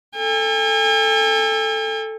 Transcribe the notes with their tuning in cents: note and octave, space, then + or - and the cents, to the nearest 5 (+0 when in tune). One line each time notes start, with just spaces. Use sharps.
A4 +0 G#5 -45